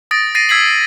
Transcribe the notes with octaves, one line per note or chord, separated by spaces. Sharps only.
D#6 A6 A#6 D7
A6 A#6 C7 D7 D#7
E6 G#6 B6 C7 F#7